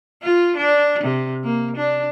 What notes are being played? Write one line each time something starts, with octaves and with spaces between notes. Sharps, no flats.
F4
D4
C3
A#3
D4